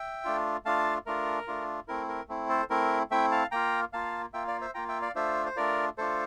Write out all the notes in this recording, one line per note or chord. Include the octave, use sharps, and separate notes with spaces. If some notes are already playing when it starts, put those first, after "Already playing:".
Already playing: E5 G5
A3 D4 F4
A3 D4 F4 F5 A5
A3 D4 F4 A#4
A3 D4 F4
A3 C4 E4 A#4
A#4
A3 C4 E4
A4 C5
A3 C4 E4 A#4
A3 C4 E4 E5 G5
F5 A5
A#3 F4 G5 A#5
A#3 F4 F5 A5
A#3 F4 E5 G5
D5 F5
C5 E5
A#3 F4 G5 A#5
E5 G5
D5 F5
A3 D4 F4 C5 E5
C5
A3 D4 F4 A#4 D5
A3 D4 F4 A4 C5